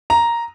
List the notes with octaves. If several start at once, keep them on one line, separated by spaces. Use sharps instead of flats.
A#5